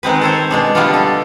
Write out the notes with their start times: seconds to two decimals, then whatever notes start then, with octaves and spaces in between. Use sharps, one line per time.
0.03 D#3 G#3 C4 B4
0.22 A4 C5 C#5
0.51 B2 G#3 D4
0.75 D3 G3 A3 B3 D4 F4
0.94 A4